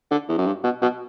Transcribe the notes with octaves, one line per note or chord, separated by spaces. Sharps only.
D3
E2
F#2
G2
B2
B2